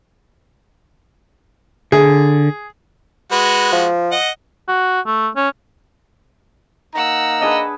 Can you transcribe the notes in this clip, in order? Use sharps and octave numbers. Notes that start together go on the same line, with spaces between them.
D3 G#4
G#3 F#4 B4
F3
D#5 F#5
F#4
A3
C#4
A#3 D#4 F#5 A#5 E6
D4 G#4 B4 D#5